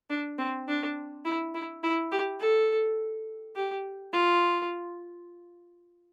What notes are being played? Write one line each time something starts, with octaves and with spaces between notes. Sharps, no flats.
D4
C4
D4
E4
E4
E4
G4
A4
G4
F4